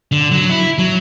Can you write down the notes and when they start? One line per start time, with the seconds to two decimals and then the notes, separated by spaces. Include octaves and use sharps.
0.12 D3
0.31 F#3
0.50 E4
0.78 F#3